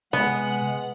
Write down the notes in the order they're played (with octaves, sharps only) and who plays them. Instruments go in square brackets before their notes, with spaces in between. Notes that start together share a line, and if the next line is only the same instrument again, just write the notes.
[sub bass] C3 [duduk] G#3 [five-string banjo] B3 [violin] F#5